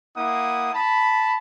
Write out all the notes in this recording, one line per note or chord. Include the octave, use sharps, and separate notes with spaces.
A#3 E4 F#5 D#6
A5 B5